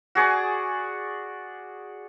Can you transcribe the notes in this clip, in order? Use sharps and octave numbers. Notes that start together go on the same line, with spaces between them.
F#4 G#4 D5 C#6